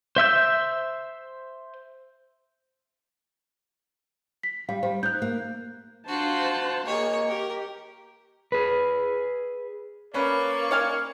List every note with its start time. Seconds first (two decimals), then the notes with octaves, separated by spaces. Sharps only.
0.16 C5 E5 E6 G6
4.43 B6
4.69 G3 F5
4.83 G3 C5
5.03 D#4 F#6 G6
5.22 A#3
6.07 D4 F4 F#4 C5 A5
6.86 A#3 G#4 C#5 D#5
7.28 G4 A#4
8.52 G#4 B4
10.14 A#3 C#4 B4 D5 C#6
10.71 C#5 F5 G#5